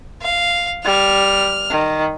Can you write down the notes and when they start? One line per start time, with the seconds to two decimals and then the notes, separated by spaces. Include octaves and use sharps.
0.22 F5
0.84 G3 F6
1.70 D#3